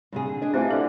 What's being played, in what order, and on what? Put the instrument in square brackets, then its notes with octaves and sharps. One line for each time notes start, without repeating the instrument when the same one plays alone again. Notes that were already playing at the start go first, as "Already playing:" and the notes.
[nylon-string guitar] G2 C3 G#4
D3
D4 G#4 D#5
[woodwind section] E3 F3 [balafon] A3 C4 [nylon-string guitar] G4
[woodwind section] D3 [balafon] A4 E5